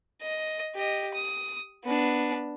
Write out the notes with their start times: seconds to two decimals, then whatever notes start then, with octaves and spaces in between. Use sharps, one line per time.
0.22 D#5
0.76 G4 D#5
1.14 D#6
1.84 B3 D4